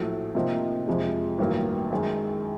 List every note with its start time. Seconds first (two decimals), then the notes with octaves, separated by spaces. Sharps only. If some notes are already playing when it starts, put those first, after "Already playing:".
Already playing: A#1 A2 F#3 A3
0.35 C3 F3 A#3 D#4
0.88 F2 C3 F3 G#3
1.38 A1 G2 D#3 F#3 A#3
1.90 F#2 D#3 G#3